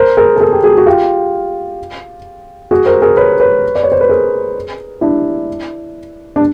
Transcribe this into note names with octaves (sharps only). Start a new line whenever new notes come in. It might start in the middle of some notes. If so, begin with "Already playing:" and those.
Already playing: A#4 C5
G#4 A#4
A4
G#4 A#4
G4
F#4 G#4
F#4
F4 G4
F#4 G#4
A#4 C5
G#4 A#4
B4 C#5
B4 C#5
D5
C#5
C5
B4
G#4 A#4
D4 E4
D4